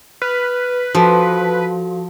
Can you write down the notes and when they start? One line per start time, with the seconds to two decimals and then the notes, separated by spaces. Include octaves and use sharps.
0.22 B4 F6
0.95 F3 F#4 A4